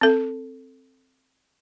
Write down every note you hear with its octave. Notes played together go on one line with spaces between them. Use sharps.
C4 A4